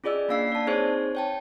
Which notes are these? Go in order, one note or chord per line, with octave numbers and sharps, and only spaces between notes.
C#4 F4 G#4 D5 D#5 E6
A#3 C#4 D4 F5 E6 C7
D5 A5
C4 D#4 G#4 C5 C#5
C#5 G5 A5